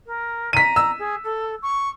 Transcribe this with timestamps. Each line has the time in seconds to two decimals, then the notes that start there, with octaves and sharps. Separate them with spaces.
0.06 A#4
0.53 A#5 B6 D#7
0.76 E6
0.98 G#4
1.24 A4
1.62 C#6